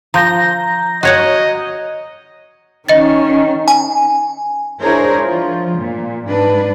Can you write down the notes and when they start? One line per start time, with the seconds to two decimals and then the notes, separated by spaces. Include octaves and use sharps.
0.14 F3 A#5 G6 A#6
1.03 F#4 C#5 D#5 F#5
2.89 D#3 C#4 D#5 A6
3.68 G#5
4.81 D4 E4 G#4 A#4 C5 C#5
5.23 F3 F4
5.77 A#2
6.26 G#2 D4 B4